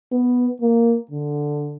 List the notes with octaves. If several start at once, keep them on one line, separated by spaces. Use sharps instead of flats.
B3
A#3
D3